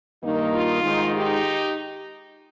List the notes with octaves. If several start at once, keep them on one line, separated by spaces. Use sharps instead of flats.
G2 D#3 A#3 D#4
F4
G#2 D#3 G#3 D#4
D#4 G4